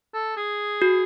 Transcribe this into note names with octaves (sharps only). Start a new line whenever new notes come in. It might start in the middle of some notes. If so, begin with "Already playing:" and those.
A4
G#4
F#4